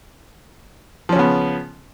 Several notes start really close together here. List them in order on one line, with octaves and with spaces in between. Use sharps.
F3 C#4 C#3 B3